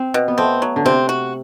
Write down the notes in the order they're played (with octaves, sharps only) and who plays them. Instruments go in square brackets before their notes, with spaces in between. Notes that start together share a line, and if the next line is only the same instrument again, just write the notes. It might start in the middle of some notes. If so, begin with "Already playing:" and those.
Already playing: [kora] C4
[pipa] B2
[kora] B3
[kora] A3 [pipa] C4
[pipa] F#3
[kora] D3
[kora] C3 [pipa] C4
[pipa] F#4